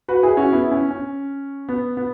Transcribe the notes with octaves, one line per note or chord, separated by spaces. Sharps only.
F#4 B4
E4 G#4
C#4 F#4
B3 E4
C#4
C#4
B3
B3